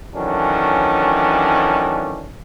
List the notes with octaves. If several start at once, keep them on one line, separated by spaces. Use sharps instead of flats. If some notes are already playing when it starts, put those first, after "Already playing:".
D#3 E3 F#3 A3 C#4 D4